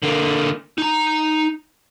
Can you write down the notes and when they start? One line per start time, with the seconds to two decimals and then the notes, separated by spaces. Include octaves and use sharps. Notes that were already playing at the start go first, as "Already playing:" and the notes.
0.03 D3 A#3
0.78 D#4 A#5